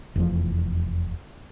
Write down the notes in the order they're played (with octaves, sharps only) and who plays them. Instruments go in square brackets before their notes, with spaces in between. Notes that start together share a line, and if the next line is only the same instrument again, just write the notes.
[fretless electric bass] F1 E2 F3